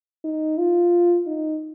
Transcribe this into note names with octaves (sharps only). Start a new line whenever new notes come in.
D#4
F4
D#4